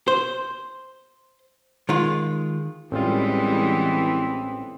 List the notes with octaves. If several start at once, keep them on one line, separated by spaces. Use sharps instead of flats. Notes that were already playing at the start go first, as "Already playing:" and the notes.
C5
D#3 G#3 F4
A1 E3 G3 G#3 B3 C4 F4